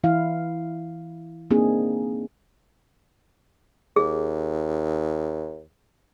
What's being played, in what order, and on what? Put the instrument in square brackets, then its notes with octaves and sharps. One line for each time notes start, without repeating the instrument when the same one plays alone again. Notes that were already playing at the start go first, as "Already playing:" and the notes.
[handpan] E3 E4 F5
A#3 C4 D4 D#4 G#4
[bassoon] D#2 [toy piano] G#4